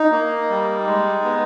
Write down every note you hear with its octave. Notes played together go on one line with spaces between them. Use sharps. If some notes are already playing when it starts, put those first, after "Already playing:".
Already playing: D#4
A#3
G3
G#3
B3